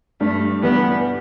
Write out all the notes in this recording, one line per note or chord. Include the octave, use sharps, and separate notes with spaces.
G2 A3
E3 G3 B3